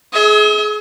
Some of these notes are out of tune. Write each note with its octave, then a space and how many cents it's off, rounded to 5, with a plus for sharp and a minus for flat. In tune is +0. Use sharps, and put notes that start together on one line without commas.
G#4 +25 E5 -45